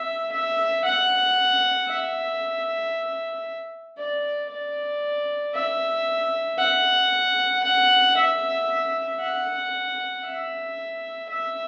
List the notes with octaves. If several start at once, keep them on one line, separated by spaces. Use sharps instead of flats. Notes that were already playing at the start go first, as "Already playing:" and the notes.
Already playing: E5
E5
F#5
E5
D5
D5
E5
F#5
F#5
E5
F#5
E5
E5